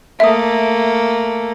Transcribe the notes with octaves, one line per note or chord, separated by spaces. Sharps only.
A3 A#3 E5 D#6